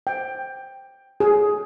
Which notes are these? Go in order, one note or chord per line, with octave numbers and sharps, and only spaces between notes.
G5
G#4